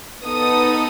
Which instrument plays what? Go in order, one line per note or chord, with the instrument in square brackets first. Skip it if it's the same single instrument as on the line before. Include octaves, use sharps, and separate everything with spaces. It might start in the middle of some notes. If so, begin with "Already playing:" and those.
[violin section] B3 D#4 A4 D#6